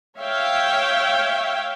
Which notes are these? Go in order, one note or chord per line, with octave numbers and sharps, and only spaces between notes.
C#5 E5 F5 G5